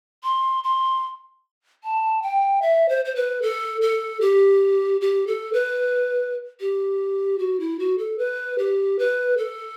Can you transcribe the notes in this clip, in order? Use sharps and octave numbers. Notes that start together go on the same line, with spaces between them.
C6
C6
A5
G5
E5
C5
C5
B4
A4
A4
G4
G4
A4
B4
G4
F#4
E4
F#4
A4
B4
G4
B4
A4